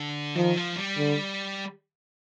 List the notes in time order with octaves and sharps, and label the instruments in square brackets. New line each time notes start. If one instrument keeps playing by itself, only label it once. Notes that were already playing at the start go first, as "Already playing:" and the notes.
Already playing: [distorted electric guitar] D3
[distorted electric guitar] D#3 [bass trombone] F3
[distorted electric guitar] F3
G3
[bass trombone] D3